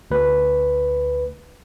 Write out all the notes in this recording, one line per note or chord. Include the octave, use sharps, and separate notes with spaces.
D2 B4